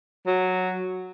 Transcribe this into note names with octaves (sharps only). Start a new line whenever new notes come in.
F#3